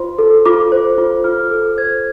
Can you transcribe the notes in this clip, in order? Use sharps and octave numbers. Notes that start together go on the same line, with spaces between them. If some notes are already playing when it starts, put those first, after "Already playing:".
Already playing: F4 C5 C6
A4
F4 D6
C5
F4
F4 F6
A4
C5 G#6